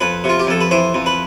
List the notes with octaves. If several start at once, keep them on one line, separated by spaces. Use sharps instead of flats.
F2 B4
C3
F4
G4
F2 A4
B4
E3 C5
F2
B4